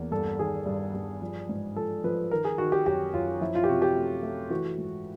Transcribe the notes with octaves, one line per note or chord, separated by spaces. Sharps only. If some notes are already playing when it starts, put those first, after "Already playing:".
Already playing: E2 A#3
G2 A4
D#3 G#4
G2
G2
F3
G#2
F3 A4
F3 B4
D#3 A#4
G#4
D#3 F#4
G4
F#2 G4
F#2 F4
F3 E4
F4
G4
C3 F#4
G4
A3
A3
E3 F#4
G#2